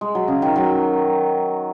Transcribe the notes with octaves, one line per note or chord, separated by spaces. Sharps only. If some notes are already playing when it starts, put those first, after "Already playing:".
G#3
F#3
C#3
D#3
F#3